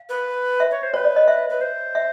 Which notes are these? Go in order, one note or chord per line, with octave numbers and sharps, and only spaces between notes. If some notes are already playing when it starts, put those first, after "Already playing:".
Already playing: F5
B4
E5
C#5
C5
B4 C#5
D5
D#5
E5
B4
C5
E5